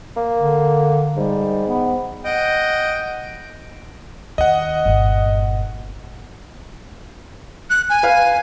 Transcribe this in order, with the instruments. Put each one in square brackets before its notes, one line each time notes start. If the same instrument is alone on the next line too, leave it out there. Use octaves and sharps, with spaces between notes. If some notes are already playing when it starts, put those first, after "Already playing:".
[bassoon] A#3
[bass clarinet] D3
[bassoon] G#2 [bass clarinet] G3
[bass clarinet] B3
[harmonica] D#5 F#5 G5
[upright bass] D#2 [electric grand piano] D#5 F#5
[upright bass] G1 A#2
[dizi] F#6
G#5
[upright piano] B4 F5